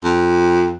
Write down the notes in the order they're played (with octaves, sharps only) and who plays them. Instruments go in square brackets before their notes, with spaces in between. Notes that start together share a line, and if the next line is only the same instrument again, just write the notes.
[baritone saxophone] F2